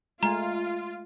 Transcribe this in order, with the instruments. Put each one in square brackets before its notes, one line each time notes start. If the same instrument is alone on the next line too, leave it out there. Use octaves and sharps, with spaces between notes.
[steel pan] G#3 A3 G#5 [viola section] F4 [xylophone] A#5